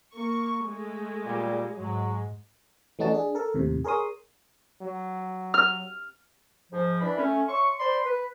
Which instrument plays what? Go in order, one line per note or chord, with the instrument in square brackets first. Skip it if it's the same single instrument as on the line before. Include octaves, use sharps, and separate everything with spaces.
[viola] A#3 [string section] C#6
[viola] G#3 [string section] A3
[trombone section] A#2 G3
[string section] G#2 G#3 [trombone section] F#3
[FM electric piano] E3 A3 C#4 D#4 F#4 A5
D4 G#4
A4 A#4
D#2 A2 C3
G#4 A#4 C#5 C6 D#6
[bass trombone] F#3
[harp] F6
[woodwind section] G#2 F3
E3 D4 B5
A3 C#4
C#5 E5 C6 C#6
C5 D5 B5 C6
B4